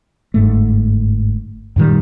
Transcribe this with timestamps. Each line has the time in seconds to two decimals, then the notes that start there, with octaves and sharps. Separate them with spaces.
0.34 G1 G#2 A3
1.76 F#2 A#2 D#3 G3